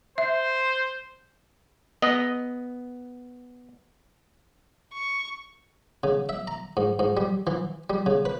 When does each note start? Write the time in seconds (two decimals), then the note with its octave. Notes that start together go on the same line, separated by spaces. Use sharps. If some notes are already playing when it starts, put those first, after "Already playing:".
0.18 C5 E5
2.02 B3 D#5
4.94 C#6
6.04 C#3
6.29 E5
6.47 A#5
6.77 G#2
6.99 G#2
7.17 G3
7.47 E3
7.90 G3
8.06 C#3
8.25 B4